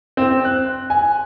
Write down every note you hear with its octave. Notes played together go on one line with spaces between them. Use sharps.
C4
F#6
G#5